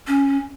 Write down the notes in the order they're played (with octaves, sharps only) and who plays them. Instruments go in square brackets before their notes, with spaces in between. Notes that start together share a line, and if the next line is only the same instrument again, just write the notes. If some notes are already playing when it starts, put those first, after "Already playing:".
[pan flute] C#4